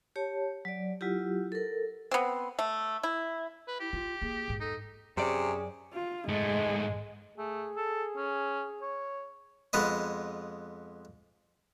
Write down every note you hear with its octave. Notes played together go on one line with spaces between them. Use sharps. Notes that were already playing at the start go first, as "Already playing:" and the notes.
G4 C#5 A5
F#3 D5
F#3 E4 F4 G4
A4 A#4
B3 C4
A3
E4
B4
E4 G4
E4 F4
A#3 G#4
E2 G#2
D#4 A4
F#2 C3 C#4 G#4 D5
F4
G#2 G#3 A3
A3 G#4
A4
C#4
C#5
F2 G#3 B3 B4 D#5